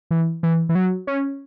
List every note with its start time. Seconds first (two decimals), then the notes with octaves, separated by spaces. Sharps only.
0.11 E3
0.43 E3
0.69 E3
0.75 F#3
1.07 C#4